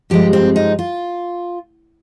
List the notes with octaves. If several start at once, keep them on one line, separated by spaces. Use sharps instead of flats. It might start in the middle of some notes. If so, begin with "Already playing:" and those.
G2 F3 G#3 G4
C4
D#4
F4